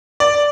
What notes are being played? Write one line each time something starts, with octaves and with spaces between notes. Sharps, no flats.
D5